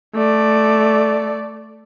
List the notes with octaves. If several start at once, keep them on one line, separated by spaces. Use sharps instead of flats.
A3 D5